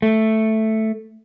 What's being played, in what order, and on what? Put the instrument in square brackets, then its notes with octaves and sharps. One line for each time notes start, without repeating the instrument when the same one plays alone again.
[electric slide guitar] A3